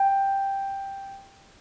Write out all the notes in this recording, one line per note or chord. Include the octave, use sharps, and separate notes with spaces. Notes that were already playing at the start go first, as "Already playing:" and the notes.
Already playing: G5